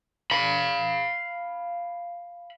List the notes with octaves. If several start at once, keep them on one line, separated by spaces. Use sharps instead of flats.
F5 B5